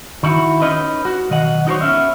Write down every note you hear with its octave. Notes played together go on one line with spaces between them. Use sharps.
D#3 E4 F#4
C#4 D#4 B4 D#5
F#4
B1 D#3 D#5 F#5
D#4 F#4 A#4 C5 C#5
B3 C#4 E5